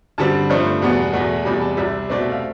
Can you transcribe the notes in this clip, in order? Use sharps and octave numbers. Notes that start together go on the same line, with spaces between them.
G2 D3 G3 C4 A5
G2 F3 A3 C4
E2 B2 G3 B3
E2 B2 A3
E2 C3 G3 B5
A5
C2 C3 G3 E5
B2 A3 C4 D5
E5
F5